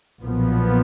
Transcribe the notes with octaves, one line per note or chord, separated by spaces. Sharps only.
B1 A#2 F3 B3